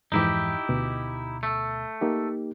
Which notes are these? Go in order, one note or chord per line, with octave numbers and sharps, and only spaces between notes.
F2 G#2 E3 D#4 E4 G4
D2 B2
A3
A#3 D#4 G4